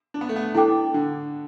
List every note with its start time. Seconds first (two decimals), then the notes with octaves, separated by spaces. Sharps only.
0.14 D4
0.21 B3
0.29 A3
0.36 B3
0.55 D4 E4 A4 G5 D6
0.94 D3